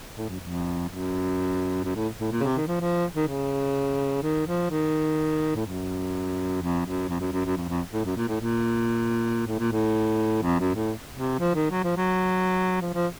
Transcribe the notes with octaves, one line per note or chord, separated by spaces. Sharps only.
A2
F#2
F2
F#2
F#2
A2
A2
A#2
C#3
C3
D#3
F3
F3
D#3
C#3
D#3
F3
D#3
A2
F#2
F2
F#2
F2
F#2
F#2
F#2
F2
F2
A2
F#2
A#2
A2
A#2
A2
A#2
A2
F2
F#2
A2
C3
F3
D#3
F#3
F3
F#3
F3
F3